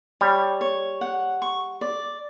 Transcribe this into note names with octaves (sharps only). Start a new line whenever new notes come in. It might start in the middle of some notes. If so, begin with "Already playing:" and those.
G3 C#5
C#5
F#5
C#6
D5